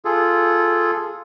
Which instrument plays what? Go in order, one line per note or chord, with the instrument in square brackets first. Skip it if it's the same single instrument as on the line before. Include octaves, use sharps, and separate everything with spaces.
[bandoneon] F4 G#4 A4